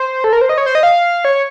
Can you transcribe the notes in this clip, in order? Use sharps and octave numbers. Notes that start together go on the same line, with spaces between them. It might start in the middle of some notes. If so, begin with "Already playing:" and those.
Already playing: C5
A4
A#4
C5
D#5
C#5
C5
D#5
F5
C#5